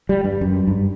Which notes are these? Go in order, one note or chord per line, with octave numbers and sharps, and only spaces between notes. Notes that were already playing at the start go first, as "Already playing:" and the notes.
G3
G2
F#2
G2